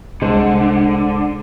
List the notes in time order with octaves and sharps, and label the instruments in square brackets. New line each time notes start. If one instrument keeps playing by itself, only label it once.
[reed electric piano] C2 G#3 C5 [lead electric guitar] D3